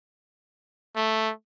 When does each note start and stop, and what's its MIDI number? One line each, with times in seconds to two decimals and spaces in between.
0.96 1.31 57